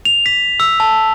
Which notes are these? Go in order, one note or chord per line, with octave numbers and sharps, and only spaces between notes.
F7
B6
E6
A5